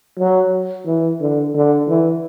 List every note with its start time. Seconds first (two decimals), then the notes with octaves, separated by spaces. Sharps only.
0.19 F#3
0.86 E3
1.21 D3
1.54 D3
1.88 E3